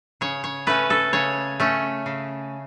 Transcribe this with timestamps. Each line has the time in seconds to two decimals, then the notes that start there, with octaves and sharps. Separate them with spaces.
0.21 C#3 C#5
0.44 C#5
0.67 A3 C#4 B4
0.90 A4
1.13 C#3 C#5
1.60 A3 C#4
2.06 C#3